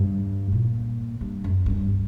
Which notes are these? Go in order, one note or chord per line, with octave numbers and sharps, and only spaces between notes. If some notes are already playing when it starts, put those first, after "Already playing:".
Already playing: G2
A#2
G2
F#2
G2